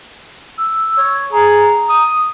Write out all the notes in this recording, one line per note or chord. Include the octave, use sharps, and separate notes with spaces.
E6
C#5
G#4 A#5
D#6